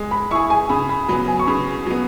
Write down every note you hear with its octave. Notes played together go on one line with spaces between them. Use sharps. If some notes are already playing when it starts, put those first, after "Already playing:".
Already playing: G#3
B5
E4 G#4 C#6
G#5
C#3 B5
B5
F#3 B3 B5
G#5
C#6
C#3 B5
F#3 B3